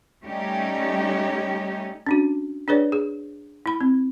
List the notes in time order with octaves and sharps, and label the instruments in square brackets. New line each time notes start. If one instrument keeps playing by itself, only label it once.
[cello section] G3 A3 C#4 D#4 G4 C#5
[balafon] C#4 D4 F#4
D4 G#4 B4 C#5 D5
G#4
E4 B5
C4